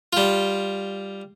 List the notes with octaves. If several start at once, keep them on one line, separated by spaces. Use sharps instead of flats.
G3 F4